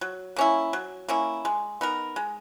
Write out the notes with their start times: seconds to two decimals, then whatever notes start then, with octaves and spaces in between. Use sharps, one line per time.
0.01 F#3
0.36 A#3 C#4 E4
0.73 F#3
1.09 A#3 C#4 E4
1.45 G#3
1.81 B3 D#4 A#4
2.16 G#3